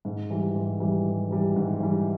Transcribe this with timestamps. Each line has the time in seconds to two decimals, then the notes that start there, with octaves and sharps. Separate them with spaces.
0.05 G#2
0.30 E3 G3
0.55 G#2
0.80 E3 G3
1.05 G#2
1.31 E3 G3
1.56 G#2
1.80 E3 G3